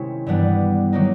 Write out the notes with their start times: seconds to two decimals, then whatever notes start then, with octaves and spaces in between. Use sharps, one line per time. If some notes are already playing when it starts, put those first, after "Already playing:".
Already playing: C3 D#3 G#3 C#4 E4
0.26 G2 E3 G3 B3 D4
0.93 D#3 F#3 A#3 D#4